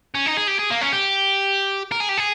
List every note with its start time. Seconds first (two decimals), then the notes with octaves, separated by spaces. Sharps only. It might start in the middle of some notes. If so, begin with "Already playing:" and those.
0.15 C#4
0.26 D#4
0.37 G#4
0.48 G4
0.59 G#4
0.70 A#3
0.81 C#4
0.92 G4
1.92 A#4
2.00 G#4
2.09 G4
2.18 G#4